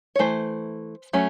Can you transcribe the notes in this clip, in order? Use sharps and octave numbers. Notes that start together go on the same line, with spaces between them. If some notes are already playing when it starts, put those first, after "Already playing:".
C#5
E3 A3 C5
F#3 A3 C#4